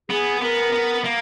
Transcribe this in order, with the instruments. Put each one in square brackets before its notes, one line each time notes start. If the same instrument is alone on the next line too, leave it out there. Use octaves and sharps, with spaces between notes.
[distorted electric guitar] B3 [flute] G#4
[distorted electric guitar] B3 [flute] A#4
[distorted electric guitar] B3
A#3